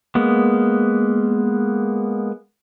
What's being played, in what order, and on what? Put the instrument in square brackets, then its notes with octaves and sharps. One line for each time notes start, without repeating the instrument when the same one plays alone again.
[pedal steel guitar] G#3 A#3 B3